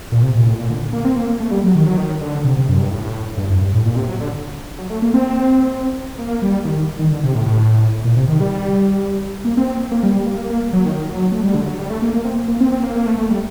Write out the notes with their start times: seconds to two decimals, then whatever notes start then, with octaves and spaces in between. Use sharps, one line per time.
0.12 A#2
0.22 C3
0.35 A#2
0.46 A2
0.58 A#2
0.70 D3
0.93 A#3
1.05 C4
1.16 A#3
1.28 A#3
1.40 A3
1.51 G3
1.63 F#3
1.75 D#3
1.87 F#3
1.97 D#3
2.21 D3
2.44 C3
2.57 C3
2.69 F#2
2.79 G2
2.91 A2
3.37 G2
3.50 F#2
3.61 G2
3.73 A2
3.85 A#2
3.96 C3
4.08 F#3
4.20 D3
4.78 F#3
4.90 A3
5.02 A#3
5.14 C4
6.19 A#3
6.42 G3
6.65 D#3
6.76 D#3
6.99 D#3
7.11 D3
7.24 C3
7.35 A2
7.46 A2
8.05 A#2
8.17 C3
8.28 D#3
8.40 G3
9.45 A#3
9.57 C4
9.68 C4
9.91 A#3
10.03 G3
10.14 G3
10.26 A#3
10.38 A#3
10.50 A#3
10.73 F#3
10.86 D#3
11.09 F#3
11.32 A3
11.43 G3
11.54 D3
11.66 F#3
11.78 G3
11.90 A3
12.02 A#3
12.13 A#3
12.25 C4
12.48 A#3
12.60 C4
12.72 C4
12.83 A#3
12.96 A#3
13.06 A3
13.18 A3
13.30 G3